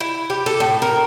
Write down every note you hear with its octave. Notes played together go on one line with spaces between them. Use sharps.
E4
G4
A4
A2
A#4